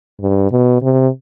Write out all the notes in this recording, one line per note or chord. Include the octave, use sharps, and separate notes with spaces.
G2
B2
C3